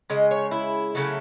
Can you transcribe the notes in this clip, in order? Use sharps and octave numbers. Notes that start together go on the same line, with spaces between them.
C#3 G#3 D#5
C#5
E4
C#3 F#3 A3